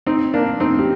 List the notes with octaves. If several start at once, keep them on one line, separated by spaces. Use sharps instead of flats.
C4 D#4
A#3 D4
C4 D#4
G4